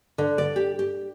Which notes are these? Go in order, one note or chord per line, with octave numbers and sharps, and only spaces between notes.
D3
D5
G4
G4